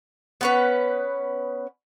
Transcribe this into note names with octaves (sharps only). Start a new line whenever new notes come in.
B3 C#4 B4